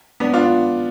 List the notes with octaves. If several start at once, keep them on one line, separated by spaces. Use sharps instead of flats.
B3 D4
D4 F4